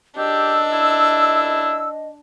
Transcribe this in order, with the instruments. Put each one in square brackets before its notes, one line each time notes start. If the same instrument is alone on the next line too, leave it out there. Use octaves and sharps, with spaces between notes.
[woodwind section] C#2 F#2 E6 [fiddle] D4 [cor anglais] G4 [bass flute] D#5
[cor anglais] E4